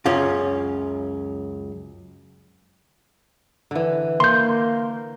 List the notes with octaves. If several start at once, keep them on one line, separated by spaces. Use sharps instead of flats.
C#2 F#2 C#4 F4
D3 E3
A#3 C6 G6